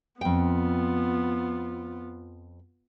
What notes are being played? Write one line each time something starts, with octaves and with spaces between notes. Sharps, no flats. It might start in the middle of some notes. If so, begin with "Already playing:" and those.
F2 B3 F4 G5